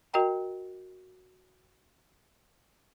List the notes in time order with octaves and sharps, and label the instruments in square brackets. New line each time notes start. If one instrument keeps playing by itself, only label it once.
[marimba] F#4 A#4 D#5 G5 A#5